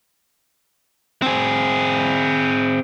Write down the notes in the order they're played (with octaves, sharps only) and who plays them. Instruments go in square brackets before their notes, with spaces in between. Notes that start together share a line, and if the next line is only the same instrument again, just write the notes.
[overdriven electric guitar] C4 G#4